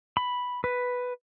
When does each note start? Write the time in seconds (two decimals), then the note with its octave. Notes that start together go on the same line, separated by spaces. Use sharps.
0.17 B5
0.64 B4